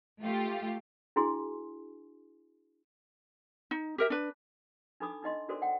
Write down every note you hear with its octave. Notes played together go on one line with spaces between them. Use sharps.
A3 F4 G4
D4 E4 F#4 G#4 G#5 C6
D#4
G4 A#4 E5
D4 B4
D4 D#4 A4 B5 D6 D#6
D4 D#4 D#5 C6
D4 F#4 A4 A#4 C5 D5
F#5 G5